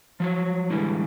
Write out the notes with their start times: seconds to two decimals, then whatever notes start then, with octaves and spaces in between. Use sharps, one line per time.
0.20 F3 F#3 C#5
0.70 A2 D3 E3 G3 G#3